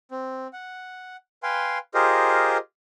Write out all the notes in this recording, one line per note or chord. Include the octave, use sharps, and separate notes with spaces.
C4
F#5
B4 F5 G5 G#5 C6
F4 G4 G#4 A#4 C5 D#5